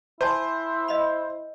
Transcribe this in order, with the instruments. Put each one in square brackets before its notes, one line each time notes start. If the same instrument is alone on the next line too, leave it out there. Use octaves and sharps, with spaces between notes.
[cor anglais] E4 [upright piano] C5 [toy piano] G#5 A5
[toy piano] D#5 B5